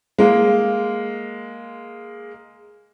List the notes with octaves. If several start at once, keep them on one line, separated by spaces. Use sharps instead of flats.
G#3 A#3